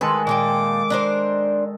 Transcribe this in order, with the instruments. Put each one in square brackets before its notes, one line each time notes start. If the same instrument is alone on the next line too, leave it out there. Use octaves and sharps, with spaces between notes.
[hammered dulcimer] D#3 G#3 A4 [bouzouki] B4
[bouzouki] A#2 A#3 G5 [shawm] D6
[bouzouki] D4 A#4 C5